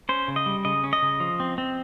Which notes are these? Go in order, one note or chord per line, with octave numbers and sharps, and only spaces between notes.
C#4 C5
C#3
D#5
G3
C#3 D#5
C#4
D#5
C#3
F3
C4
C4